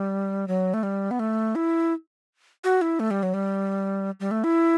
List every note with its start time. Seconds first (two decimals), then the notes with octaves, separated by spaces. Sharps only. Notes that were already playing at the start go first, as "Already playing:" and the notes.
Already playing: G3
0.48 F#3
0.74 A3
0.83 G3
1.11 B3
1.19 A3
1.55 E4
2.64 F#4
2.81 E4
3.00 A3
3.11 G3
3.23 F#3
3.34 G3
4.20 G3
4.31 A3
4.44 E4